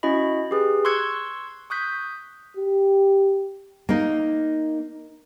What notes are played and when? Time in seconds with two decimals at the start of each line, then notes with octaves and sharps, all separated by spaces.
0.03 C#4 E4 F#4 D#5 B5
0.51 G4 G#4 B4
0.85 C6 C#6 E6 F#6 G#6 C#7
1.70 C#6 D#6 F#6 G6 B6
2.57 G4
3.89 A#3 D#4